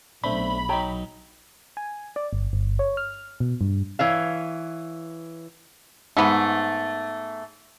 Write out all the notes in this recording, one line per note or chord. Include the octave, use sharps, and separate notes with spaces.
B1 A3 C4 D4 B5
F#3 D#4 C#5 G5 A#5
G#5
D5
G1
G1
C#5
F6
B2
G2
E3 C#5 F5
G#2 A3 B3